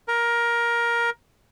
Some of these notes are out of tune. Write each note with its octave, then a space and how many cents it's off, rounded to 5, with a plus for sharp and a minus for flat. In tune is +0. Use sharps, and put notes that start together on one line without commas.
A#4 +15